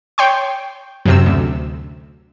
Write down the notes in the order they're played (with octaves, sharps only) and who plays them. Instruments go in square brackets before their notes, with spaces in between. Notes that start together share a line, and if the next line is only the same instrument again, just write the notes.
[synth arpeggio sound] C#5 G5 C6
F#2 C3 E6
D2